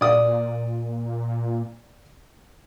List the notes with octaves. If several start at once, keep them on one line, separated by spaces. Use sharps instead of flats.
A#2 D5 D#6